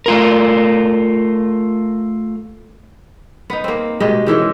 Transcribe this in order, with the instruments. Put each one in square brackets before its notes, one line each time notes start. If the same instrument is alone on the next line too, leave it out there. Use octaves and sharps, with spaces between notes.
[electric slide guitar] A3 F4 A#4
[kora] B3 D#4
A#3 C4
B2 G#3 G4 D#5
D#3 E3 G#3 C#4